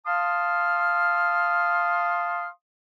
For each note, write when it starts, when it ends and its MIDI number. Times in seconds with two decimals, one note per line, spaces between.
0.06 2.47 77
0.06 2.47 81
0.06 2.47 84
0.06 2.47 87
0.06 2.47 89